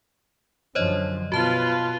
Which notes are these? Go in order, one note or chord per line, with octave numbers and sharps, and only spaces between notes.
F#2 D3 F3 C5 C#5 D#5
B2 F4 F#4 B4 A5 G7